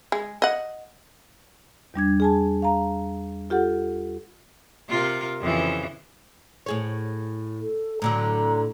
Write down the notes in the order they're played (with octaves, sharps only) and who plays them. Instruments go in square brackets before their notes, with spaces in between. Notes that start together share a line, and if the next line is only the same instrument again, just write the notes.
[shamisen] G#3
D#5 F#5
[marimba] E2 G3 D4 G#6
G#4 G#5 A5
F5 A#5
F4 G4 A4 F#5
[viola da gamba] C3 F4 A#4
F2 C#3 E3
[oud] A2 G#4 C#5
[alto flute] A4
[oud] A2 D3 F#3 [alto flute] A#5